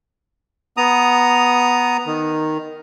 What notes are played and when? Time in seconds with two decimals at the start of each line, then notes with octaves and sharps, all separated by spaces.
0.77 B3 A#5 D#6
2.07 D#3